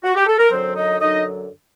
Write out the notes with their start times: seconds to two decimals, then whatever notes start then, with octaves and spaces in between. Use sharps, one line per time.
0.04 F#4
0.15 G4
0.27 A4
0.38 A#4
0.50 F#2 D3 F#3 C4 C5
0.75 D#4 D#5
1.00 F#2 D3 F#3 D#4 D#5